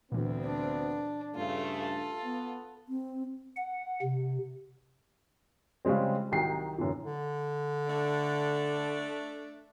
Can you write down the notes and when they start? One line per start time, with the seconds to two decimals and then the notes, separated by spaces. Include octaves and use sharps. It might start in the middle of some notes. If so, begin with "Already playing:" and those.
0.12 D2 A#2 E3 B3 C4
0.45 D4
1.35 G2 C#3 A3 F4
1.77 F4 A4
2.25 B3
2.89 C4
3.56 F#5
4.02 C3
5.85 C#3 F3 G3 G#3 C4
6.32 C2 D#3 F#3 D#4 G5 C7
6.78 F#2 B2 D3 E3
7.04 D3
7.88 A3 D4